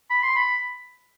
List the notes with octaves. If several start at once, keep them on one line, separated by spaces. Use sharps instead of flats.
B5
C6
B5